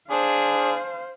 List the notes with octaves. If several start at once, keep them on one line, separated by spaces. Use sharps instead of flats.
D4 G#4 C5 F5